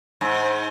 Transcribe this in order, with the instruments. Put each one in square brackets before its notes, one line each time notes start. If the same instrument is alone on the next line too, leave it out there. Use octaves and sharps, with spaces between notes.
[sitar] G#2